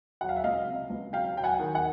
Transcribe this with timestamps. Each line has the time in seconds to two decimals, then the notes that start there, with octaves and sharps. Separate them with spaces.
0.21 F#3 F#5
0.29 F5
0.36 E5
0.44 C#2 D#5 F5
0.67 C3
0.90 C#2
1.13 F#3 F5 G5
1.36 F#3 G5
1.44 F#5 G#5
1.59 D#3
1.75 F#5 G#5